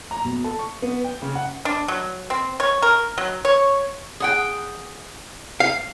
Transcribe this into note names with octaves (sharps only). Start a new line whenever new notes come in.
A#5
B2
A4
C#6
B3
G5
C#3
F#5
D4
F#3
C4
C#5
A#4
F#3
C#5
G#4 F#5 G5
F5